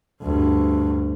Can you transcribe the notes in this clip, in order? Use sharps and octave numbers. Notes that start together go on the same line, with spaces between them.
D2 G2